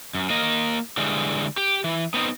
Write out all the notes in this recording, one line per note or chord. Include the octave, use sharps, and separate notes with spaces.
F#2
A#3 D#5
D3 E3 G3 G#3
G4
E3
B3 C4 D#4